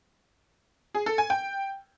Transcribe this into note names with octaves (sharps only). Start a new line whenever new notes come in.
G#4
A4
G#5
G5